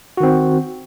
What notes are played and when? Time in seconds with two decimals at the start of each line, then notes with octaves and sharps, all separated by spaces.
0.17 F#4
0.20 D#3
0.23 C4